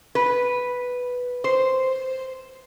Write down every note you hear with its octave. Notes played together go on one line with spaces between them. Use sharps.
B4
C5